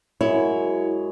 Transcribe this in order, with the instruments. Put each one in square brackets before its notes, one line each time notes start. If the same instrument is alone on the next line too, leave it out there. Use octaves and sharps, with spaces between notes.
[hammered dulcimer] F#2 G#3 [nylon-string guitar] E4 [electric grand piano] C#5